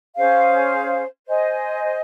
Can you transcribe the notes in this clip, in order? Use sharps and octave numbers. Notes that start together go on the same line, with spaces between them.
C#4 G#4 C5 F5
C5 D#5 G#5